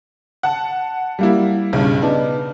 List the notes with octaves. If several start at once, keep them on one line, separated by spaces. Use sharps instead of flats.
F#5 A5
G3 A#3 E4
B1 G2 C#3
B3 D4 D#4